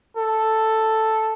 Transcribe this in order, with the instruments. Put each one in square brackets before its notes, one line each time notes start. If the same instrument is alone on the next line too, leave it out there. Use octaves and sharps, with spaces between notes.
[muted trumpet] A4